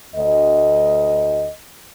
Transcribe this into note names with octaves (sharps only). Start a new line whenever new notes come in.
D2 D#5